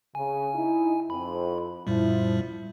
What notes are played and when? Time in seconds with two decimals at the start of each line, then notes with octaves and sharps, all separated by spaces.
0.15 C#3 G#5
0.55 D#4 E4
1.10 F2 B5
1.87 F#2 A#2 F3 G3 E4